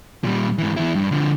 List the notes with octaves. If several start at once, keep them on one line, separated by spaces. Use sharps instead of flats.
A#2 G3
G#2 E3
E2 E4
G2
D3 F3